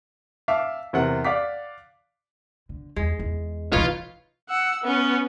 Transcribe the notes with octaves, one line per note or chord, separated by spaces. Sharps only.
E5 F5 A5 D6
E2 C3 A#4 F#5
D5 F5 F#5 D6 B6
D3
E2 G#3
E2
B2 E3 D#4 F4 B4 C#5
F#5 E6
B3 C#4